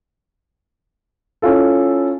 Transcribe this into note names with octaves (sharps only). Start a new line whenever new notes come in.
C#4 E4 F4 A4